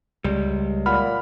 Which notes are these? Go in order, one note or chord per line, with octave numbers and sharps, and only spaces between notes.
C#2 G3
A#2 F#5 B5 F6